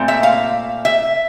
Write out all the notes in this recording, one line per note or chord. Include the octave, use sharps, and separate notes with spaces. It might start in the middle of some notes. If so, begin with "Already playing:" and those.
Already playing: A#2 A3 C4
E5
F5
E5